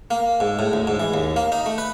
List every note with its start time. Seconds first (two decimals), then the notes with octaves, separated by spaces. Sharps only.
0.11 A#3
0.40 G#2
0.59 A2
0.73 D2
0.87 G#2
1.00 E3
1.14 D#2
1.36 A#3
1.52 D#4
1.66 A3
1.78 B4